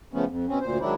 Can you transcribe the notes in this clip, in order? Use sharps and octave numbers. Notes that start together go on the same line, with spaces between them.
C#3 F3 A3 B3 C#4
F2
B2 C4 C#4
D2 A#2 C5
G#2 D#3 F#3 D4 E4